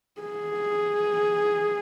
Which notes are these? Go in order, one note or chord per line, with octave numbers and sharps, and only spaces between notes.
G#4